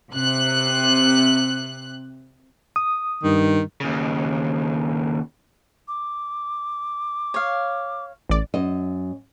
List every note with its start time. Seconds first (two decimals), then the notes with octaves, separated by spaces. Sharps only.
0.12 C3 F#6
2.76 D#6
3.24 G2 D#3
3.81 D#2 C#3
5.88 D6
7.34 C#5 F5
8.30 A1 D5
8.54 F#2 D#5